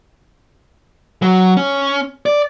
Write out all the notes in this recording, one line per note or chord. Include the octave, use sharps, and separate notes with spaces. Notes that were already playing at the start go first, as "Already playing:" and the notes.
F#3
C#4
D5